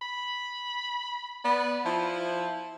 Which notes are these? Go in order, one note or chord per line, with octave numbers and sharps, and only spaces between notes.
B5
B3 D5
F3 E4